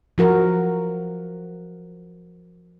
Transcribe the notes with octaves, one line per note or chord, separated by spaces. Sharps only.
F3 F#4 A#4